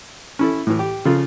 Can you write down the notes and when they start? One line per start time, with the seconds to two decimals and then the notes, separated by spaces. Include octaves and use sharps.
0.39 C#4 E4 A4
0.67 A2 E3
0.79 G4
1.05 C#3 F3 F4 A4